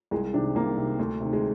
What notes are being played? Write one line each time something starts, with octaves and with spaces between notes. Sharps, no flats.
C2 G#3
C3 D#3 D4
C2 A#3
C3 D#3
D2
C3 D#3
G#3